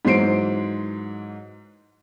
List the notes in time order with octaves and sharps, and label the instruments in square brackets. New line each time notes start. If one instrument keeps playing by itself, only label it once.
[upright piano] G#2 E3 F#3 C5 C7 D7